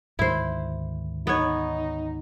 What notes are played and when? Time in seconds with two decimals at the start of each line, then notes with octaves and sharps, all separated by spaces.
0.19 D2 G#2 D#3 E4 C5
1.27 B3 D#4 C#5